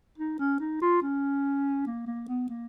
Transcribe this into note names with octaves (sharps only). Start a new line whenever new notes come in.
D#4
C#4
D#4
F4
C#4
A#3
A#3
B3
A#3